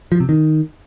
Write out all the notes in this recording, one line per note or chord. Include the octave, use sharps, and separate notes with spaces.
F3
C3
D#3